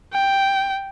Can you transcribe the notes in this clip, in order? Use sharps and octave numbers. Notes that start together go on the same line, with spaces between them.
G5